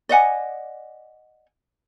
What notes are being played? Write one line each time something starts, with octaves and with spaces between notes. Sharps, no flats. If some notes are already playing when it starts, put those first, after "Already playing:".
D5 D#5 F#5 G#5